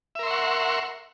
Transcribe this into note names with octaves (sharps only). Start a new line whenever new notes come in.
A#4 E5 F#5 C6 C#6